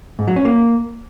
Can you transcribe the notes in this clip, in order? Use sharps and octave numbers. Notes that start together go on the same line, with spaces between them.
G#2
F#3
C#4
A#3